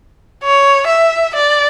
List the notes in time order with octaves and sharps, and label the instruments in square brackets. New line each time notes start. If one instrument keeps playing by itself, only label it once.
[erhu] C#5
E5
D5